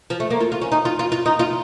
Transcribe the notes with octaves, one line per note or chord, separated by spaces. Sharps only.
F3
A3
A#3
F4
F4
C#4
D#4
F4
F4
F4
D#4
F4